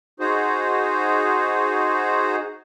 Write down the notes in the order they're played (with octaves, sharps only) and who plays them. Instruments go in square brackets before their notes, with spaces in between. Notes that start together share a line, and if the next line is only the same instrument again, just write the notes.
[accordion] D#4 F#4 G#4 C5